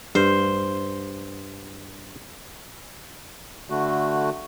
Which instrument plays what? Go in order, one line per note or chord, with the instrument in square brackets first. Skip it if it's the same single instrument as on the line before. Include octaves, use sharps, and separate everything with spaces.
[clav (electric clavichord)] G2 [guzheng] C5
[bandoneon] D3 A3 F#4